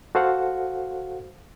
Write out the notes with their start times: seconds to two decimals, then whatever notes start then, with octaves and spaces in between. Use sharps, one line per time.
0.15 F#4 A4 C5 F5 F#5